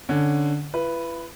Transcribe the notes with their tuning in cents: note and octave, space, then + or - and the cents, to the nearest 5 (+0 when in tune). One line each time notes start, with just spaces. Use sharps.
D3 +0 C#4 +0
E4 +40 B4 +0